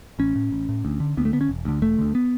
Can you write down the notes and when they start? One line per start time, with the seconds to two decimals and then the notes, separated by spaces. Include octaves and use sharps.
0.19 A1 C#4
0.36 A2
0.52 A1
0.69 A2
0.85 D2
1.00 D3
1.17 D2 B3
1.25 A3
1.33 D3 B3
1.41 C#4
1.49 E1
1.65 D2 D3
1.82 E1 A3
1.98 D2 D3
2.15 B3